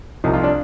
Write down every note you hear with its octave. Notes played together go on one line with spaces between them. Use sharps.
C2 C3 F3 D#4
F4
D4